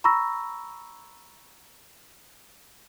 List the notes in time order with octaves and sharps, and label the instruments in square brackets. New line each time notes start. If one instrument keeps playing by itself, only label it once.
[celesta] A#5 B5 C#6 E6 A#6